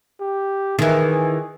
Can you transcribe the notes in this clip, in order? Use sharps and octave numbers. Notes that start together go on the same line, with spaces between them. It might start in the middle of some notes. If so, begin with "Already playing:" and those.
G4
D#3 E3 G#4